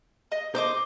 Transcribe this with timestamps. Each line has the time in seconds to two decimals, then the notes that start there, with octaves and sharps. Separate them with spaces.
0.32 D#5
0.55 C5 D#5 C6 D6